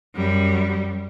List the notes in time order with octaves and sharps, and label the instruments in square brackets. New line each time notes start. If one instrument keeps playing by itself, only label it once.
[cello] F#2 G3